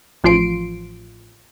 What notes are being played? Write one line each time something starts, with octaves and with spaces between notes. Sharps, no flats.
A1 F3 F4 C6 C7 D7